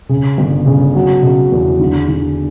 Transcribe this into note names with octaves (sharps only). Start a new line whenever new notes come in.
C#3
G1
C#3
F#3
C#3
E2
D3
D3